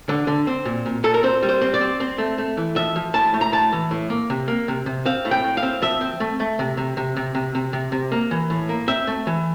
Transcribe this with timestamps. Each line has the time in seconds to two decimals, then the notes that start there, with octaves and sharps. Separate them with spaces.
0.09 D3
0.27 D3
0.47 C4
0.65 A#2
0.86 A#2
1.04 A#2 A4
1.14 A#4
1.23 C4 C5
1.43 G3
1.49 C5
1.62 C4
1.74 D5
1.81 C4
2.00 C4
2.18 A3
2.38 A3
2.57 E3
2.76 F3 E5
2.96 F3
3.14 A2 A5
3.34 A3
3.41 A#5
3.52 A2 A5
3.72 E3
3.91 A2
4.10 A#3
4.30 C3
4.48 A#3
4.68 C3
4.86 C3
5.06 C4 F5
5.25 A2
5.31 G5
5.44 A2
5.57 F5
5.63 C4
5.82 F3 E5
6.01 C4
6.20 A3
6.40 A3
6.59 C3
6.77 C3
6.97 C3
7.17 C3
7.35 C3
7.55 C3
7.73 C3
7.92 C3
8.12 A#3
8.31 E3
8.50 A2
8.69 A#3
8.88 C4 E5
9.07 A3
9.27 E3